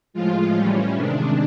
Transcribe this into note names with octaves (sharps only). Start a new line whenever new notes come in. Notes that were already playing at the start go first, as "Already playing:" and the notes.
A2 F3 G#3 F4
A2 E3 G3 C#4
C3 D#3 G#3 D4